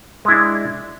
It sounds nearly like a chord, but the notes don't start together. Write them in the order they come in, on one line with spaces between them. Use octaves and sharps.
G#3 E4 D4